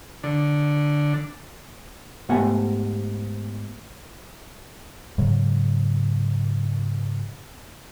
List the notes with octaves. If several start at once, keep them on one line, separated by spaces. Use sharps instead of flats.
D3
G#2 A3 B3 G4 F#5 G#5
G#2 C#3 F#3